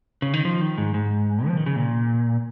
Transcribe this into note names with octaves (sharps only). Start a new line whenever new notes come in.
C#3
D#3
F3
D#3
G#2
G#2
F3
D#3
C#3
A#2